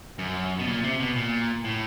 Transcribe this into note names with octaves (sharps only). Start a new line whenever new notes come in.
F#2
B2
A#2
C3
B2
A#2
A2